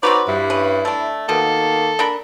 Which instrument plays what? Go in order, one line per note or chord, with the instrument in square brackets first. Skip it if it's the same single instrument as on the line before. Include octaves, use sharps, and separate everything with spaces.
[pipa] C4 F#4 B4 [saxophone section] D#4 C#5 D5
[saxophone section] G2 [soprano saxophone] E4
[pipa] C#4 B4
A3 D4
[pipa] B2 [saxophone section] D#3 A#3 [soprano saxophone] A4
[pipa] D4 A#4 B5